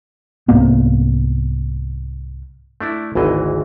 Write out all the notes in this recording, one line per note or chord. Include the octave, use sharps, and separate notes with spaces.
C2 G#2 A#3 B3
A3 D4 E4
G#1 D2 E3 D#5